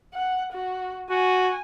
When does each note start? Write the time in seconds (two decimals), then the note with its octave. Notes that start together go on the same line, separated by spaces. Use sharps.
0.14 F#5
0.53 F#4
1.11 F#4 G#5